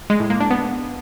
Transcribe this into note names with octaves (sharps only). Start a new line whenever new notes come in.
G#3
A2
A#3
D4
B3